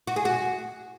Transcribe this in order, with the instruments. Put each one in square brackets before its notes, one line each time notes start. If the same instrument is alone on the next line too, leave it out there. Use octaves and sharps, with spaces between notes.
[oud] F#4
G#4
F#4